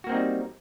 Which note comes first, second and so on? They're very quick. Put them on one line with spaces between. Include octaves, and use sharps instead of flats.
F#4 A#3 C4 D#4 G3